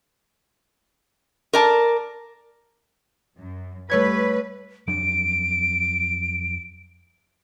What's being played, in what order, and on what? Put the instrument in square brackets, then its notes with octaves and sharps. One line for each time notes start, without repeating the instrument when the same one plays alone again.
[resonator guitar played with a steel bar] A#4 D5 A5
[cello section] F#2
[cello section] G3 B4 [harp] A3 C#5 G#6
[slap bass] F2 F#3 D4 [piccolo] D7